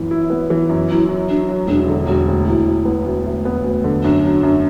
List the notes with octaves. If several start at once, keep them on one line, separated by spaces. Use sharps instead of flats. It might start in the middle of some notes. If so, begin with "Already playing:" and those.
Already playing: F#2 E3 B3 E4
E4
B3
E3
F#2
F#3 E4
F#3
F#3 D4
F#3
E1 D4
D3
E1 F#4
D2
D2 E4
D2
B3
D2
D2
B3
D2
D3
F#2 D4
F#3
F#2